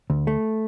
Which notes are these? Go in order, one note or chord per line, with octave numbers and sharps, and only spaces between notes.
D2
A3